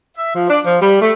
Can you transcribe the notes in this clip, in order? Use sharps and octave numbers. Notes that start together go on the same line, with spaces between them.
E5
F3
D4
F3
G3
A3